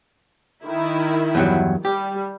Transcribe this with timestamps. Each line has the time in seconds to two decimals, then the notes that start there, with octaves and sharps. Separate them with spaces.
0.64 D#3 E4
1.35 E2 G2 F#3
1.85 G3 G4